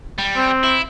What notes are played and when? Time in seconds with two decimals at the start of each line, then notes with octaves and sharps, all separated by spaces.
0.18 G3
0.36 C4
0.63 E4